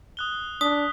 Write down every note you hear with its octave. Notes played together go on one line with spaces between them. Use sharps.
D#6 F#6 G7
D4 D#6 B6